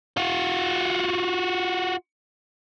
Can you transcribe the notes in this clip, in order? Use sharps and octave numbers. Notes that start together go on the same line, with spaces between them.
F4 F#4